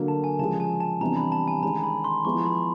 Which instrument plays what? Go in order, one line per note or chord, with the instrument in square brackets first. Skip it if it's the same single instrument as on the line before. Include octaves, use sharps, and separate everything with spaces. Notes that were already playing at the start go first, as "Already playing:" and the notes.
Already playing: [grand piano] D3 F#3 A#3
[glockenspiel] A5
G#5
[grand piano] C#3 F3 G#3 [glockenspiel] A5
[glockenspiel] G#5
A5
[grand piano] C3 E3 G3 B3 D4 [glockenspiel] A#5
[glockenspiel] B5
A5
G#5
[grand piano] D#3 G#3 C#4 [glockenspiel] A#5
[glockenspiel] B5
C6
[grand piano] F3 G#3 B3 E4 [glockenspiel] C#6
[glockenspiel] B5